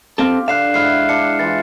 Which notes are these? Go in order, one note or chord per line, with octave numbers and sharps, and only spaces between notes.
C4 G4 A4 F5 C6
D3 F5 F#6 C7 E7
G#2 E4 F#5 F6 C7
D4 C#7
E3 F4 A6